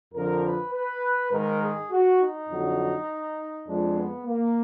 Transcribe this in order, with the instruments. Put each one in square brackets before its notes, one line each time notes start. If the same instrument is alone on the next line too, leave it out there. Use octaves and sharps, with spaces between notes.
[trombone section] F2 D3 F3 A#4
B4
B4
G#2 D#3 G#3 A#4
G#4
F#4
D#4
F2 D3 F#3
F2 F3 G#3 D4
B3
A#3